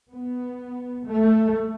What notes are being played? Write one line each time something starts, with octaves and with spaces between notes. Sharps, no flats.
B3
A3